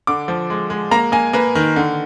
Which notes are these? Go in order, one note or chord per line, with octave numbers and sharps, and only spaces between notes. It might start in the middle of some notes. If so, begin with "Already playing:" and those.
D3 D6
F3
G#3
G#3
A#3 A#5
A#3 G#5
A#3 B4
D#3
D3